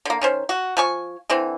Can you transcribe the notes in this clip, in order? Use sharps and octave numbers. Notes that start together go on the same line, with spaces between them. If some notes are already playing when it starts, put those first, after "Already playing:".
D3 A#3
D#3 C#4 C5
F#4
F3 G#5 C#6
D3 E3 C4